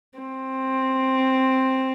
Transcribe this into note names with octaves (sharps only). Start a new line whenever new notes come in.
C4